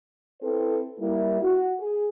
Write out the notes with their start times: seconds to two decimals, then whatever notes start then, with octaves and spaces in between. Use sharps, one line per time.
0.41 C4 E4 A4 B4 C5
1.00 G3 A#3 E4
1.41 F#4
1.80 G#4